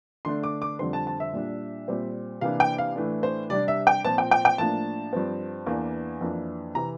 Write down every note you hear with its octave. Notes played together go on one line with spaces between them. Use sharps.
D3 A3 D4 C6
D6
D6
F2 D3 G3 C4 C6
A5
A5
E5
A#2 G3 D4
A#2 G3 C4
C3 E3 A#3 D4 F5
G5
F5
A2 E3 A3 D4
C5
C3 G3 D4 D5
E5
G5
A#2 F3 C4 A5
G5
G5
G5
A2 F3 A#3 D4 A5
G2 F3 C4
E2 E3 A#3 D4
F2 E3 A#3 D4
C3 E3 A#5